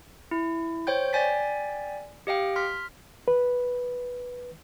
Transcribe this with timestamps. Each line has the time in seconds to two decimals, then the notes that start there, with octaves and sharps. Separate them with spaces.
0.31 E4
0.87 C5 C#5 G5 G6
1.13 D5 G5 G#5 A6 B6
2.27 G4 D#5 F5 G5
2.56 C6 F6 B6
3.28 B4